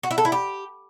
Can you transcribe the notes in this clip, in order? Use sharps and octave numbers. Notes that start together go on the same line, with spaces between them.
F#4
E4
A4
E4
G4